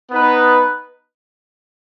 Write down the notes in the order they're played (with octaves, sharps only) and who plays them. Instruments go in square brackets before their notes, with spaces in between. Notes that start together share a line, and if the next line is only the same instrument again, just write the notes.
[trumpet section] B3 D#4 B4